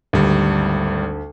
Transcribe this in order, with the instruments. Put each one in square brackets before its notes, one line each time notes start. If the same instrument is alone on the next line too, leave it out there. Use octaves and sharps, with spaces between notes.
[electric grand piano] G#1 G3 [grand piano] D2